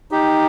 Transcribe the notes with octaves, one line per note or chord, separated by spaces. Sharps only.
D#4 G4